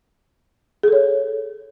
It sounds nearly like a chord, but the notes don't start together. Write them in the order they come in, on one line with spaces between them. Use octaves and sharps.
G#4 A4 C#5